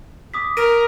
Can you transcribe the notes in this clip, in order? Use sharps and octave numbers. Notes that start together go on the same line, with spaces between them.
D6 D#6 B6
A#4 A#6 D7 D#7